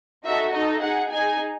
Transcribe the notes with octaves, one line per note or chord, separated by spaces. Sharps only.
D#4 F#4 A4 E5
D#4 A4 D#5
D#4 G#4 F#5
D#4 G#4 G#5